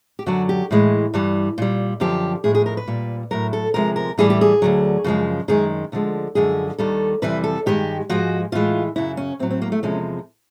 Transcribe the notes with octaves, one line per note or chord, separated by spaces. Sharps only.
G4
F#2 D3 F#3 F#4
G4
A2 E3 G#3
G2 E3 G3
A#2 G3
F#2 D3 F3 G4
A2 F3 G#3 G#4
G#4
A#4
B4
A#2 G3
A2 F#3 A#4
A4
D2 C3 F3 G#3 A#4
A#4
A2 E3 G3 G#4
G4
G#4
D2 D3 F#3
F#2 C#3 F3 G#3
F#2 D#3 G#3 G#4
D2 D3 F3 G#3
F#2 D3 F3 G#3 G#4
D#2 D#3 G3 A4
F2 C3 E3 G3 B4
A4
G2 D#3 G#3 G4
G#2 F3 G#3 F#4
A2 E3 G#3 F4
F#2 C#3 F#3 E4
C#4
A2 F#3 C4
C4
A#3
A3
E2 C3 F3 G#3 C#4